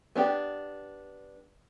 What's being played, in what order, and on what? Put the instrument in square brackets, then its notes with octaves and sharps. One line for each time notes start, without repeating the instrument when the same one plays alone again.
[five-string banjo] B3 D4 G4